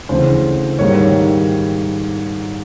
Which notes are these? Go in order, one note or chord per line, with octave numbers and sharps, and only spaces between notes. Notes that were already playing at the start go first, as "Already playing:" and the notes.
D2 C#3 E3 C5
G#2 D#3 G3 A#3 C#5